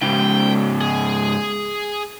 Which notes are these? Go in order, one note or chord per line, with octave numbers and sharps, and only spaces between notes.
G#2 C#3 G5
G#4